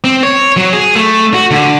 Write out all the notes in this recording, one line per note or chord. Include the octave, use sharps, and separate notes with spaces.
C4
C#5
F#3
G#4
A3
F#4
D3